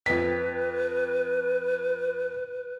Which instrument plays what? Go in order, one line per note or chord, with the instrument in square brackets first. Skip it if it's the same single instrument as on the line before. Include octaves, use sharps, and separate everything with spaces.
[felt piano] F2 B6 [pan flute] B4